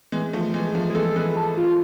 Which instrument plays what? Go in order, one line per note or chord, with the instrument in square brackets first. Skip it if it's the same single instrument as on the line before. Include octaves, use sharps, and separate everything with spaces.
[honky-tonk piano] E3 G#3
F3 A3
E3 G#3
F3 A3
[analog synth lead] G#4
[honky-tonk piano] E3 G#3 [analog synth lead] A4
[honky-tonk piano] E3 G#3 [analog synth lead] B4
[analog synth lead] A4
F4